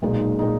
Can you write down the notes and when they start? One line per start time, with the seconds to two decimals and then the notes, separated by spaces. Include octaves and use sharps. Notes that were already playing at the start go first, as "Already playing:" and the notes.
0.02 B1 A#2 G#3 D#4
0.39 A#2 G#3 D#4